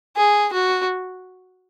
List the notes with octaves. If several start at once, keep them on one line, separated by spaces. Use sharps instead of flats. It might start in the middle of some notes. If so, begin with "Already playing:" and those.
G#4
F#4